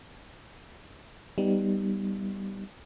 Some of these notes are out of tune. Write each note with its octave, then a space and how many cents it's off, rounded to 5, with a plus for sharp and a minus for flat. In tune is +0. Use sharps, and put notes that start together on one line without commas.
G3 +0 B3 +5 D#4 +0